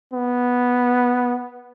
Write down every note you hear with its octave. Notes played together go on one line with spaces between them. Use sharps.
B3